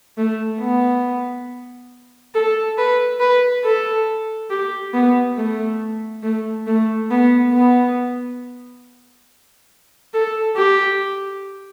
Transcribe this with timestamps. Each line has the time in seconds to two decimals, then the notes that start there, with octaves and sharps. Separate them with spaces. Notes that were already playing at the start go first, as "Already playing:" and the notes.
0.18 A3
0.60 B3
2.35 A4
2.78 B4
3.20 B4
3.64 A4
4.50 G4
4.93 B3
5.37 A3
6.23 A3
6.67 A3
7.11 B3
7.53 B3
10.14 A4
10.56 G4